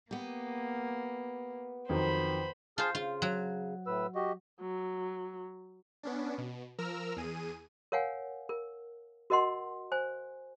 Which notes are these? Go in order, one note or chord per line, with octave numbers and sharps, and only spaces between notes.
A#3 B3 G4
F2 D#3 F#3 C5 B5
F4 G#4 C5 A5 F6
C#3 F4
F#3
A2 B4 E6
F#4 G4 D#5
F#3
B3 C#4 D4
B2
F3 A#4 A#5 E6 F6
E2 G#4 D#7
A#4 C#5 F5 F#5 G#5
A#4
F#4 A#4 D#5 F#5 C6
C5 G#5